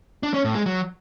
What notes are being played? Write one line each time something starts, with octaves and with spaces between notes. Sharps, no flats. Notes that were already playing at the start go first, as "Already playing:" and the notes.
D4
C#4
A2
G#3
F#3